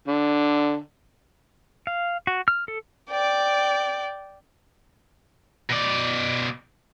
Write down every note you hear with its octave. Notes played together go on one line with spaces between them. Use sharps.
D3
F5
F#4
F6
A4
D5 G5
B2 D5